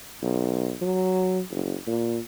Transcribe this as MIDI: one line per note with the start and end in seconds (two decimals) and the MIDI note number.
0.23 0.74 35
0.81 1.40 54
1.51 1.75 30
1.87 2.18 46